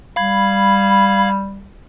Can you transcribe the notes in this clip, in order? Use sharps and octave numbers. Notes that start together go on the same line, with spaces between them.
G3 F5 B5 G#6